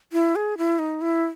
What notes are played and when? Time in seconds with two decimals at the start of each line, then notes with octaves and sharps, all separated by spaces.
0.13 E4
0.36 G#4
0.58 E4
0.79 D#4
1.01 E4